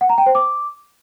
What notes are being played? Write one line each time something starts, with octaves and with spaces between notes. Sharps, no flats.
F#5
A#5
G5
C5
D6